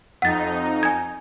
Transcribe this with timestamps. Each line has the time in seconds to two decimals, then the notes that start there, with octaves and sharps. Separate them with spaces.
0.22 F2 D#4 F#5 A6
0.83 G#5 G#6